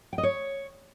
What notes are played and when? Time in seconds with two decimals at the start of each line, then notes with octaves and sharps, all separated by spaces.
0.13 G5
0.18 D#5
0.23 C#5